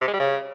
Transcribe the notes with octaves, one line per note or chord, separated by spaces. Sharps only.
C3
G#3
G3
C#3